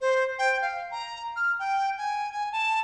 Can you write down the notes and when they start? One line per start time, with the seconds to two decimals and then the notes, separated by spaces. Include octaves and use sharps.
0.01 C5
0.39 G5
0.62 F5
0.91 A#5
1.36 F6
1.59 G5
1.98 G#5
2.32 G#5
2.52 A5